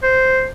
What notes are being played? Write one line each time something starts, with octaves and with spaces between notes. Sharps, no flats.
C5